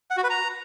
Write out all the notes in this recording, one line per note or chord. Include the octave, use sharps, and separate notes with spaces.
F#5
F#4
B4
A#5